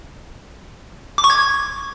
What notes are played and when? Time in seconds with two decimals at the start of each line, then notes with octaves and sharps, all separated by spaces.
1.18 D6
1.24 C#6
1.30 G#6